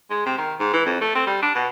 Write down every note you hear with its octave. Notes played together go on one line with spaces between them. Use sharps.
G#3
C3
D#3
G#2
E3
F2
A3
C4
G3
D4
B2